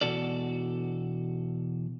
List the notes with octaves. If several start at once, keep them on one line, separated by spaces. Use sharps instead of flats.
E2 B2 F#4 A4 D5